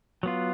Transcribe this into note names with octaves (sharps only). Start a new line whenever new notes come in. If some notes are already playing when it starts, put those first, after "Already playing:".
F#3 B3 F4